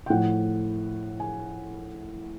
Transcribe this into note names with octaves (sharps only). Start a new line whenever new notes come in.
G5
A2 F3 F#5
G#5